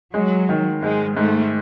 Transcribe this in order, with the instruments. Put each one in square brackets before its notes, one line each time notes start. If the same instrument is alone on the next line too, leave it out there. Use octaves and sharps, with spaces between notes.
[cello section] F#3 [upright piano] G#3
[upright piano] D#3
[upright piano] G#2 [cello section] G#3
[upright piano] G#2 [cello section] A3